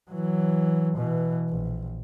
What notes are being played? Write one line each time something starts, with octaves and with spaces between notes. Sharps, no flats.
E3 F#3
B2 E3
A#1